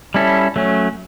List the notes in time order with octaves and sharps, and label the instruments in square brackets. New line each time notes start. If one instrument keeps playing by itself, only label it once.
[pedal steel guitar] G3 C#4 E4 A4
F#3 A3 C#4